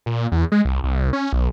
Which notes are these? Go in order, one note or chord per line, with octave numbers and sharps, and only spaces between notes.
A#2
E2
G#3
C2
C2
C#4
B1